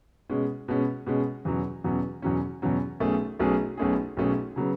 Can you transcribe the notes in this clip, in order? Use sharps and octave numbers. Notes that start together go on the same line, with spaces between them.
B2 G#3 C#4
B2 G#3 C#4
B2 G#3 C#4
E2 B2 F#3 C#4
E2 B2 F#3 C#4
E2 B2 F#3 C#4
E2 B2 F#3 C#4
B1 B2 A3 C#4 G#4
B1 B2 A3 C#4 G#4
B1 B2 A3 C#4 G#4
B1 B2 A3 C#4 G#4
C#3 F#3 B3